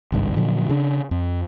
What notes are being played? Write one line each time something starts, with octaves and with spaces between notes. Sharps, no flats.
G#1 C#2 G2
A#2 D3 F3 F#3
C#3 D4
F2